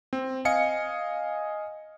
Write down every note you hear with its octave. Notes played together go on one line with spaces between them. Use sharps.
C4
D#5 F5 G#5 C#7